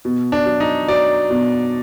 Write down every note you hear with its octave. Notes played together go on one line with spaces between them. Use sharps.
B2
D4
F#3
D#4
F#3 D5
B2